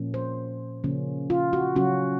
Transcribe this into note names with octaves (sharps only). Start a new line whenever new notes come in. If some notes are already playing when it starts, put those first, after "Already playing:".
Already playing: A#2 F3 A#3 C#4
C5
C#3 F3 A#3 C#4
F4
F#4
C#3 F#3 C#4 F#4